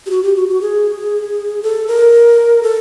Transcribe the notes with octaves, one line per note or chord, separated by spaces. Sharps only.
G4
F#4
G4
F#4
F#4
G#4
A4
A#4
A4